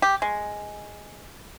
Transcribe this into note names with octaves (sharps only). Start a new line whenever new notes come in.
G4
G#3